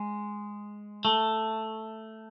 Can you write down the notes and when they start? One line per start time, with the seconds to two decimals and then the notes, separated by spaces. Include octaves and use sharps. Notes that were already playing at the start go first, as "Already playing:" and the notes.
Already playing: G#3
1.05 A3